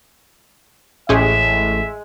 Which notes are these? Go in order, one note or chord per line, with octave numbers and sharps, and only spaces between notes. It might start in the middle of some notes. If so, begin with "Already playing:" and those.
A1 A2 G#3 C#4 G4 G#4 E5